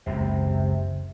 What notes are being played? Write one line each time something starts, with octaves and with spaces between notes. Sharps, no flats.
F#1 C#2 F#2 C3